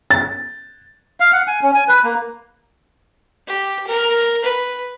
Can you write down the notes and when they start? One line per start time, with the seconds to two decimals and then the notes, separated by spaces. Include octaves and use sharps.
0.10 A6
1.20 F5
1.33 F#5
1.48 G#5
1.62 C#4
1.74 G#5
1.88 B4
2.04 A#3
3.47 G4
3.87 A#4
4.44 B4